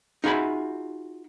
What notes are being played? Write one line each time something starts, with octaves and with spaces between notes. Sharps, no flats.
D#4 F4 F#4 G#4 E5 B5